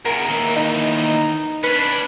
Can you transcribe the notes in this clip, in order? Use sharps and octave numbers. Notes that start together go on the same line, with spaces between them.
E2 C#3 A#4
D#2 E3
D#4
C#4 D4 B4